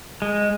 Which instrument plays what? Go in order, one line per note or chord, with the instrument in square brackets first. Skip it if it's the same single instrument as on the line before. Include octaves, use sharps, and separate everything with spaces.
[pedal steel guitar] G#3